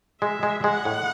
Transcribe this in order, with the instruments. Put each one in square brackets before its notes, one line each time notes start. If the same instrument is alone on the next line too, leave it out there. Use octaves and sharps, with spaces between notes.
[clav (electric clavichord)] G#3 [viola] E5
[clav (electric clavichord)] G#3
[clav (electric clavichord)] G#3 [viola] F#5
[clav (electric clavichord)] A2